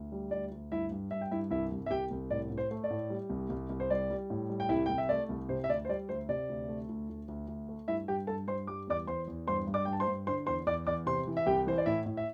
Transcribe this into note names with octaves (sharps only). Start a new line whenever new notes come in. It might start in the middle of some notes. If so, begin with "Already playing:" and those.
Already playing: D2
G3
D2 D5
D2
G2 E4 E5
G2
G2 E5
G5
G2 E4 E5
C2 E4 E5
C2
E5
C2 G4 G5
C2
A2 D5
A2
C5
A3
D5
A2
G3
C2
C2
C2
C5
G3 D5
G3
A2
G3
G5
C2 E4 E5
C2 G5
E5
A3 D5
C2
C3 C5
E5
D2 D5
C5
G3 D5
D2 C5
C3 D5
D2
A3
D2
D2
D2
D2
A3
G2 E4 E5
G2 G4 G5
G2 A4 A5
G2 C5 C6
G3 D6
E2 D5 D6
E2 C5 C6
E2
G2 C5 C6
G2
D5 D6
G2 G5
A5
C5 C6
G2
D3 C5 C6
E2 C5 C6
E2 D5 D6
E2 D5 D6
C3 C5 C6
E3
E5
C2 G4 G5
E3 C5
D5
A2 E4 E5
A2
E5